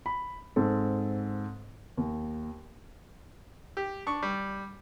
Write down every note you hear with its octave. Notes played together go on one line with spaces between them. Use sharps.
B5
G#2 C4 A4
D#2
G4
D4 C#6
G3